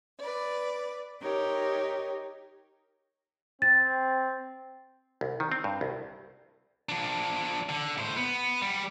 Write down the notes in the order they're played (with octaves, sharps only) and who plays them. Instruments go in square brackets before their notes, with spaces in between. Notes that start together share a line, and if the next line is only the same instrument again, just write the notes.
[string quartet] B4 D5
D#4 G4 A#4 C#5
[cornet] C4 [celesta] A6
[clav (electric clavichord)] C2
D#3
C4
G2
C2
[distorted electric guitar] F3 D4
D3
A2 C5
B3
G3